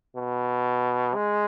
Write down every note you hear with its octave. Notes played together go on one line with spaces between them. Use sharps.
B2
G#3